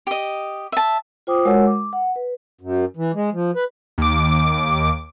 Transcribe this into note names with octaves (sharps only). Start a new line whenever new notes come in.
G4 D#5
E5 A5
F4 C5 G5 D6 D#6
G#3 F#4 A#4 C#5 F#5 E6
D6
F#5
B4
F#2
E3
G#3
F3
B4
D#2 D6